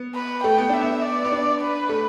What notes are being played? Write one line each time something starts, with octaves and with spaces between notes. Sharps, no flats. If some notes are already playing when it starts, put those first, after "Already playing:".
Already playing: B3
B4
A3 G5
B3
D4 E5
B3
D5
B3
D4
B4
A3